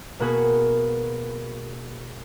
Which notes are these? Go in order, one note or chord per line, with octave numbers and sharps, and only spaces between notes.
B2 A#3 B3 F#4 G#4 B4